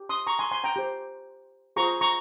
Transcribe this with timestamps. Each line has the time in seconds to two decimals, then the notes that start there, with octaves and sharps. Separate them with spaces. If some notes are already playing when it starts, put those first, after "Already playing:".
Already playing: G4
0.09 C6 D#6
0.27 A#5 C#6
0.39 G#5 C6
0.51 G#5 C6
0.64 G5 A#5
0.76 G4 C5
1.76 F4 G#4 C5 A#5 C#6
2.01 A#5 C#6